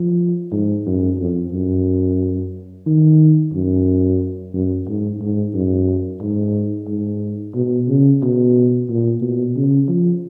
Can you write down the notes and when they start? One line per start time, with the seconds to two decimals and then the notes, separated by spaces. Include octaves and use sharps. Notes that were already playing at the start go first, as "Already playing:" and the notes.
Already playing: F3
0.52 G#2
0.86 F#2
1.20 F2
1.52 F#2
2.86 D#3
3.53 F#2
4.54 F#2
4.88 G#2
5.21 G#2
5.54 F#2
6.21 G#2
6.88 G#2
7.55 B2
7.88 C#3
8.23 B2
8.89 A#2
9.22 B2
9.56 C#3
9.89 F3